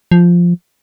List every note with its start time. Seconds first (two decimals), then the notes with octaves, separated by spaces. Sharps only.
0.12 F3